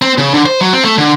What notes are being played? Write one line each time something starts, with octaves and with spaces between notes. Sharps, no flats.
C4
C#3
D3
C5
F#3
C4
A3
D3